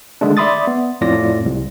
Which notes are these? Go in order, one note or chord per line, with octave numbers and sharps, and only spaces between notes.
D3 D#3 G#3 A3 D4
D5 E5 B5 C6 D#6 A6
B3
F2 A2 F4 D5 A#6
C2